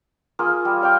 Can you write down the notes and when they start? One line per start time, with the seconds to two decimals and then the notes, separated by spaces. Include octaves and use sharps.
0.39 A#3 F4 G#4
0.65 G3
0.82 C#5 F5 G5 D6